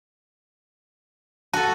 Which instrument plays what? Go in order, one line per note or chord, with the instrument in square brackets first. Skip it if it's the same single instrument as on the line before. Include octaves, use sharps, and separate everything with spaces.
[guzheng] F#4 A4 [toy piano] A5